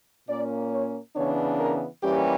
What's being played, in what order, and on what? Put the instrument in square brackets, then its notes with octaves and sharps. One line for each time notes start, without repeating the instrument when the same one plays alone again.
[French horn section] A#2 A#3 C#4 D5
C#5
C#3 E3 B3 D4 C#5
A#4
E3 G3 A#3 C#4 G4